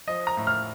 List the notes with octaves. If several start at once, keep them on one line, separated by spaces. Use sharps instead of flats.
F3 D#5
A#5
A2
F6